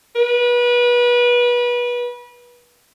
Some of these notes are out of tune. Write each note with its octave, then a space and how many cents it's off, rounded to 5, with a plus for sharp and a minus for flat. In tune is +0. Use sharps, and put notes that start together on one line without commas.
B4 -30